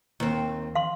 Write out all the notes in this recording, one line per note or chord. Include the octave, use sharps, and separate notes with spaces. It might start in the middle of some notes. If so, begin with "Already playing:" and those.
D#2 C4
F5 C6